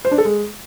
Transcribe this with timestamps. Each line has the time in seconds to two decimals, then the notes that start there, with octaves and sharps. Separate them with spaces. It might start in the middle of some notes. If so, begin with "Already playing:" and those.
0.05 C5
0.11 D4
0.18 A4
0.25 G#3